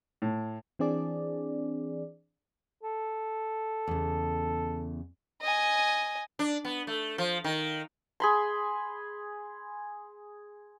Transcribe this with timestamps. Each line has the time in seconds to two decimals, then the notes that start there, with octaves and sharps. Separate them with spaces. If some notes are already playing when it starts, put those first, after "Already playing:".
0.22 A2
0.79 E3 C4 D4 G#4 D5
2.83 A4
3.88 E2 C#3
5.42 D#5 G#5
6.39 D4
6.65 B3
6.87 A3
7.18 F3
7.44 D#3
8.20 G#4 B5 C6